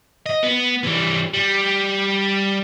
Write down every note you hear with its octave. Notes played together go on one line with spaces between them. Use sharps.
D#5
B3
E3 G3
G3